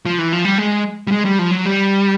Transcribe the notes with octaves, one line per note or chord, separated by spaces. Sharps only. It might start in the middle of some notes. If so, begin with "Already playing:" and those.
F3
E3
F3
G3
G#3
G3
G#3
G3
F3
F#3
G3